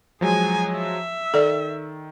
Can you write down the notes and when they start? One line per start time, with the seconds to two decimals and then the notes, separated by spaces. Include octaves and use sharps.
0.21 F3 F#3 G#3 G#4 G#5
0.76 E5
1.34 D#3 A4 D5